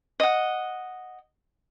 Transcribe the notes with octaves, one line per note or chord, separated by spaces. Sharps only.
D#5 F#5